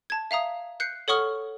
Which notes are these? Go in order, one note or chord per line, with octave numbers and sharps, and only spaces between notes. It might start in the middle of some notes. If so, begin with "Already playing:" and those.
A5 G#6
E5 F5 A#5 D#6
F#6 G6 C7 C#7
A4 C#5 F#5 C#6 D#6 F6